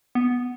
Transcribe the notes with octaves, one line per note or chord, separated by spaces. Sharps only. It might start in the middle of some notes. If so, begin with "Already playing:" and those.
B3